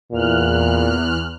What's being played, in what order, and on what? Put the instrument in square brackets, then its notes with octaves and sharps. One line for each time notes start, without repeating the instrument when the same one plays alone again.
[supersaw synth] E2 F6 F#6 [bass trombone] A#2